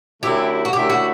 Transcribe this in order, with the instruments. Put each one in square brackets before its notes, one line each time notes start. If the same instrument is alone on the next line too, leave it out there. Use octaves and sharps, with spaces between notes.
[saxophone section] F#2 D3 A3 E4 [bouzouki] G4
[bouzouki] F#4
[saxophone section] F#2 D3 A3 E4 [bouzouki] G4
[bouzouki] F#4